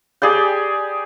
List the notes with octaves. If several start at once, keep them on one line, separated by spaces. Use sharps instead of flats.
G4 G#4 D5 G5